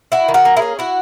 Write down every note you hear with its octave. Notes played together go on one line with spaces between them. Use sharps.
E4 F#4
D#3
F#4 A#4
A#3
E4 G#4
C#4
E4 F#4